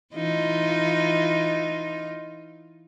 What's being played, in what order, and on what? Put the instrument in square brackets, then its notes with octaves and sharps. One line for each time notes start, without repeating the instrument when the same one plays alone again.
[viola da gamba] E3 D#4 F4